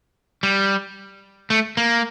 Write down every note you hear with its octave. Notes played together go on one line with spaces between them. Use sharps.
G3
A3
A#3